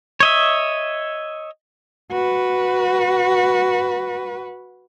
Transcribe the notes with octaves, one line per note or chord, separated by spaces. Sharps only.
C#5 D#5 E5
F#4 B4